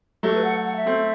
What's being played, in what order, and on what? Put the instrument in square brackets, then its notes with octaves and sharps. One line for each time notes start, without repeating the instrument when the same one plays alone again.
[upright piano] F#3 A3 [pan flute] G4
[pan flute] B4
F#5
F#5
E5
[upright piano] A3 C4